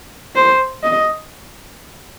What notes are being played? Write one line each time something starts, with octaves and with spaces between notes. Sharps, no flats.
C5
D#5